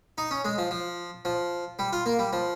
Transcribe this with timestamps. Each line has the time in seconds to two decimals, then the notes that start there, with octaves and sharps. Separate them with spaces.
0.18 D#4
0.31 C#4
0.45 G#3
0.58 F3
0.71 F3
1.25 F3
1.79 G3
1.93 F4
2.06 A#3
2.19 G3
2.33 F3